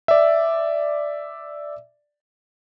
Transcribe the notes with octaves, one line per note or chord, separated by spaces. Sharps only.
D5 E5